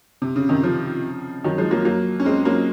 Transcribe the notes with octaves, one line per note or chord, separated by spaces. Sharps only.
C3
C#3
C3 D#3
C#3 F3
D#3 F#3
F3 G#3
F#3 A#3
F#3 A#3
C#4
G#3 C4
F#3 A#3